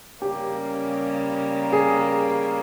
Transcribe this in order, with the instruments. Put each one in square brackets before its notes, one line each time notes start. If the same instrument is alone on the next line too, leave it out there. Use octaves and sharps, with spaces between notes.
[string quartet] C#3 G3 A#3 C#4 [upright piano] G4
[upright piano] G#4